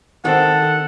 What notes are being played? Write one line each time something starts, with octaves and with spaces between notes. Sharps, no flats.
D#3 C4 A4 F#5